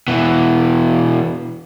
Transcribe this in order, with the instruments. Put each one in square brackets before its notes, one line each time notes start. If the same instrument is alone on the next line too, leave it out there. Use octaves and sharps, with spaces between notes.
[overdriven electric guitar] B2 E3